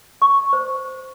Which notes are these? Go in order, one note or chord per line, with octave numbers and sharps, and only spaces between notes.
C#6
C5